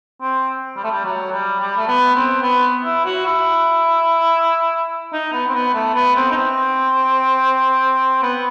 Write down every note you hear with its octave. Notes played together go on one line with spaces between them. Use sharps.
C4
G3
A3
G3
F#3
G3
G3
A3
B3
C4
B3
E4
F#4
E4
D#4
B3
C4
B3
A3
B3
C4
D#4
C4
B3